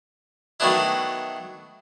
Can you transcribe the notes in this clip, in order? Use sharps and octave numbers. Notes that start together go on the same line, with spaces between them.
D#3 F#3 A3 B3 D4 E4